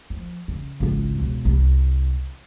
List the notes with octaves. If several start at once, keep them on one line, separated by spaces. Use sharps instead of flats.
F3
C#3
G#1 C#2
E1
C2